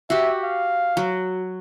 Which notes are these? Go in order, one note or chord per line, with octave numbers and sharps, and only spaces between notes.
F#4 G4 E5
F5
F#3